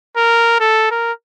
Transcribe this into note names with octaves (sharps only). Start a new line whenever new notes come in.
A#4
A4
A#4